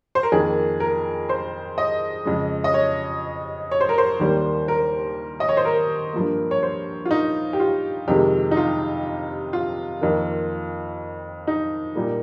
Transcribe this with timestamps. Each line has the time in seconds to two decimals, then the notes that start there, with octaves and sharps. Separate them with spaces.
0.15 C5
0.23 A#4
0.32 F2 D#3 A#3 G#4
0.80 A#4
1.29 C5
1.78 D#5
2.25 F2 C#3 G#3
2.64 D#5
2.74 C#5
3.71 C#5
3.81 C5
3.89 A#4
3.98 C5
4.20 D#2 D#3 G3 A#3
4.68 A#4
5.40 D#5
5.49 C#5
5.57 C5
5.65 A#4
6.13 G2 F3 A#3
6.51 C#5
6.63 C5
7.05 F4
7.11 D#4
7.53 G4
7.60 F4
8.08 F2 C3 D#3 G#3 G4
8.51 D#4
8.57 F4
9.53 F4
10.01 F2 D#3 A#3
11.47 D#4
11.95 A#2 G3 A#3